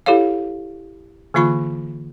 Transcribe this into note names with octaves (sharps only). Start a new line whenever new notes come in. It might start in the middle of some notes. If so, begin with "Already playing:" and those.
E4 G4 A4 C#5 F5
D3 E3 A#3 F4 B5 C#6